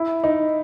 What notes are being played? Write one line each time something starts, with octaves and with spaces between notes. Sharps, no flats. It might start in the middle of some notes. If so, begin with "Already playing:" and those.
Already playing: E4
D#4